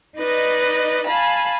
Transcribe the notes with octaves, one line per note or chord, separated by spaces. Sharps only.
D#4 B4 D5 D#5
F5 G#5 A5 B5